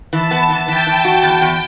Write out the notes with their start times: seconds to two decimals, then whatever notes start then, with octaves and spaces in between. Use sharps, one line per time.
0.13 E3 A5
0.31 B3
0.50 E3
0.68 E3 G5
0.87 E3
1.05 F#4
1.23 E2 G5
1.41 E2